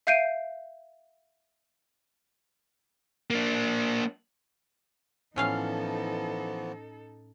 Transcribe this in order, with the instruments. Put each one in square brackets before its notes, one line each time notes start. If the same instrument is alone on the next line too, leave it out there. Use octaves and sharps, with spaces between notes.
[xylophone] E5 F5 G6 C7 D7 D#7
[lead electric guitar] A#3 D4
[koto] A2 C#4 F5 [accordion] E3 F3 B3 [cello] D#4 A4